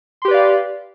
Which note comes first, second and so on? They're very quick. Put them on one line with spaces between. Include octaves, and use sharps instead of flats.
C6 G4 B4 D5 F5